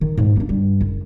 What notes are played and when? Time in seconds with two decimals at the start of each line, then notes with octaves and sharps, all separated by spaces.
0.01 D#3
0.18 G#2
0.36 A#3 D4
0.49 G2
0.81 F#1